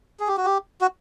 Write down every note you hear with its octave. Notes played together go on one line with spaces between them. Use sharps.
G#4
G4
F#4
G4
F#4